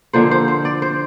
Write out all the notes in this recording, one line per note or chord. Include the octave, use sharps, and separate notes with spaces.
D3 F3 A#3 C5
C5
C5
D5
C5